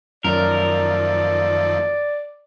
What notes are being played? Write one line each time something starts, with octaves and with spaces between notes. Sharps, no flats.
F#2 D#3 F3 A3 A#4 D5